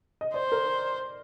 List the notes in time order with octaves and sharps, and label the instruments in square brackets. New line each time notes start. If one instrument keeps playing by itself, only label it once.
[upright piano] D#5
[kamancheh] C5 [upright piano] D5
[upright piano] A#4